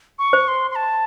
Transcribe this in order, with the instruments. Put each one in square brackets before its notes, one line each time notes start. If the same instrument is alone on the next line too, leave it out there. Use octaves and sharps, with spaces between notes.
[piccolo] C#6
[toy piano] C5
[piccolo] C6
C6
A5